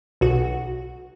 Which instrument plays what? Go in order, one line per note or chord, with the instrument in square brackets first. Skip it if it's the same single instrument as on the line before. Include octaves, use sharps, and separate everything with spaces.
[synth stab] B1 F#4